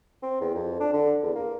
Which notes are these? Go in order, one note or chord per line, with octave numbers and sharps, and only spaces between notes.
C4
E2
F2
D4
D3
E2
A#3